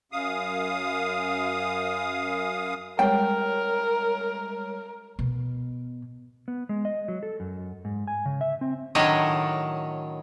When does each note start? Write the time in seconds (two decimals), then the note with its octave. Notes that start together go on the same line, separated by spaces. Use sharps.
0.12 F#2 F5 D#6
2.99 G3 G#3 A#4 C#5 G5
5.19 B2
6.48 B3
6.69 G#3
6.85 D#5
7.08 F#3
7.23 A4
7.40 F#2
7.85 G#2
8.08 G#5
8.26 C#3
8.41 E5
8.61 C4
8.95 A2 D#3 F#3 D4 C#5 D#5